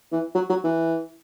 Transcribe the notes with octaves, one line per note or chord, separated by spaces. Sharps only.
E3
F#3
F#3
E3